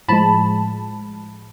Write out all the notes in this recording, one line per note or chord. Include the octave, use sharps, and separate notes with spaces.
A2 F3 G#3 A5 B5